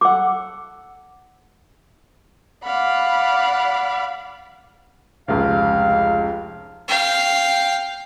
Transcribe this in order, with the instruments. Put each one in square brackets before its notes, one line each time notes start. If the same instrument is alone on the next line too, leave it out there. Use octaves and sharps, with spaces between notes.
[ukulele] A4 F#5 [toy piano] D6
[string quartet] D5 F5 F#5 B5
[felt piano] F1 C#2 [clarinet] F5
[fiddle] F5 G5